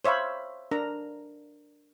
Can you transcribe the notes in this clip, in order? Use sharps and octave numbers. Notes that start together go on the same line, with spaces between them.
C5 C#5 E5 F5 B5
D4 A#4 A#5